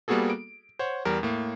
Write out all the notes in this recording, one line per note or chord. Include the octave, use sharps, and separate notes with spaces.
G3 A#3 B3 F#4 G#4 A4
D7
C5 C#5 F#5
E2 G3 A#4
A2 A#3